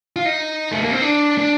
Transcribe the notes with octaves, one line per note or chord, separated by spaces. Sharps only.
F4
D#4
A3
A#3
C4
D4
D4